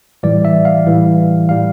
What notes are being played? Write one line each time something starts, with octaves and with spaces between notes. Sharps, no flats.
A2 E3 G3 D5
E5
F5
A2 E3 G3
A2 G3 F5